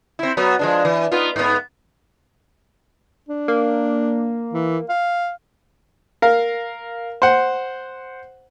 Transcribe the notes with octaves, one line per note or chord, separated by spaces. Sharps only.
C4 E4
F#3 B3
F3 G#3 D4
E3
B3 D#4 F4
G#2 B3
D4
A#3
E3
F5
A#4 F5
C5 F#5